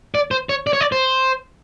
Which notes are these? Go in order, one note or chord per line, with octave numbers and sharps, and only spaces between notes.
D5
C5
C#5
D5
C#5
D5
C5